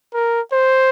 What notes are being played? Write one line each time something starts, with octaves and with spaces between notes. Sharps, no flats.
A#4
C5